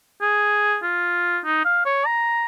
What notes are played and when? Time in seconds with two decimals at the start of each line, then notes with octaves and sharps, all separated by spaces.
0.22 G#4
0.83 F4
1.45 D#4
1.65 F5
1.85 C#5
2.06 A#5